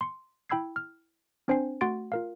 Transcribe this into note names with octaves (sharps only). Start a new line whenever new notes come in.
C6 C#7
E4 G5 B5 E6 G#6 C7
F6
C4 D4 C5 G5 G#5 C7
A3 F#4 F#5 C6 A6 D7
F4 A#4 F5